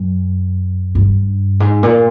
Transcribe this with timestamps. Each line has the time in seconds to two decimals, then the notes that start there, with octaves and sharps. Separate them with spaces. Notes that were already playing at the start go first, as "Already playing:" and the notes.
Already playing: F#2
0.95 G2
1.60 G#2
1.83 A#2